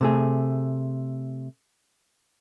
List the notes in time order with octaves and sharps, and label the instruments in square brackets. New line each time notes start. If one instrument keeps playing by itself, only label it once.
[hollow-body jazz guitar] C3 A3 G#4